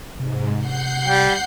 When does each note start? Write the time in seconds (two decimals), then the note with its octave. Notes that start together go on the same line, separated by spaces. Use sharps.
0.20 G#2 C3
0.58 F#5 G6 C7
1.05 G3 G5